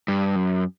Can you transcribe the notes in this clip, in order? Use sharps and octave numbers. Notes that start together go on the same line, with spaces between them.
G2
F#2